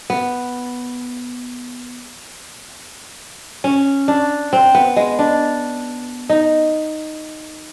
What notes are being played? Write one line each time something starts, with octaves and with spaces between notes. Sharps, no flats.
B3
C#4
D4
C4
B3
G#3
D4
D#4